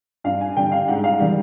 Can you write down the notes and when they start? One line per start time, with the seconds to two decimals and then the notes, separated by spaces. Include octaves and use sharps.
0.24 G2 F5
0.41 G#5
0.57 D3 G3 G5
0.72 F5
0.88 G#2 F#5
1.04 F5
1.20 D#3 G3